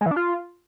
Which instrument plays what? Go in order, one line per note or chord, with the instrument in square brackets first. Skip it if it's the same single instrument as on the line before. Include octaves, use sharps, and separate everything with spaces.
[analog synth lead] G#3
E3
D4
F4